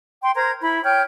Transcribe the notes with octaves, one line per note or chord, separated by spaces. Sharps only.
G5 C6
A#4 C5 A#5 G#6
E4 B5
C#5 G5 F6 G6